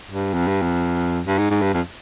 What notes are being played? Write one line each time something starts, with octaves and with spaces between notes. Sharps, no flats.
G2
F2
G2
F2
G2
G#2
G#2
G2
F2